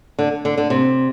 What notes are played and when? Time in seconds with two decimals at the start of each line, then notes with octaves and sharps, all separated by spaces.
0.19 D3
0.45 D3
0.58 D3
0.70 C3